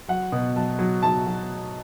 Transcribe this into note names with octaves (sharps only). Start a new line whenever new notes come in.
F#3 F#5
B2
F#3 A5
F#3
F#3 A5
F#3